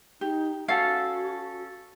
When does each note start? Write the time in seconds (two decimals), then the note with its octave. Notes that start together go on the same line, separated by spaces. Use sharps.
0.21 D#4 G4
0.68 C#4 F#4 A4 F5 F#5